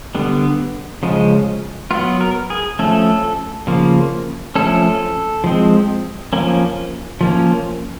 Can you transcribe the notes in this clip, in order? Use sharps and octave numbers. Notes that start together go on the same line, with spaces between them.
D3 G3 B3
C#3 F3 G#3 C#4
F#3 B3 F4
A#4
G#4
F3 A3 C#4 A4
C#3 F3 A#3
F3 A3 C#4 A4
F3 G#3 C4
F3 A#3 C#4
F3 A#3 C#4